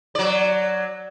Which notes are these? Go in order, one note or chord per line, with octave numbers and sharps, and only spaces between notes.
F#3 D5